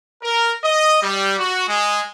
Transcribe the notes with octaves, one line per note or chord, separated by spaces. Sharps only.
A#4
D#5
G3
F#4
G#3